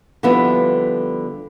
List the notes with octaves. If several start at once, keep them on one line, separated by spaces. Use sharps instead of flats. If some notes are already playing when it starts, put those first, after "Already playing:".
D3 F3 G3 B3 E4 B4